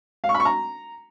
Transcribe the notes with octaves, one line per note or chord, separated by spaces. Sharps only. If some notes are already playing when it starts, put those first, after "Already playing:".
F5
C#6
B5
C#6
A#5